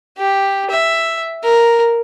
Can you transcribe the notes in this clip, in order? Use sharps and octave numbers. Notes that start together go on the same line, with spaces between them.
G4
E5
A#4